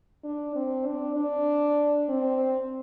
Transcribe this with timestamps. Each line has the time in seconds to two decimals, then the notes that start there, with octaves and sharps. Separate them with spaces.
0.24 D4
0.56 C4
0.86 D4
1.16 D4
2.09 C4